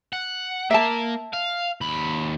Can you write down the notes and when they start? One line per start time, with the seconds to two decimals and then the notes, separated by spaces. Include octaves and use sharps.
0.13 F#5
0.71 A#3 E5 A5
1.33 F5
1.81 D#2 B5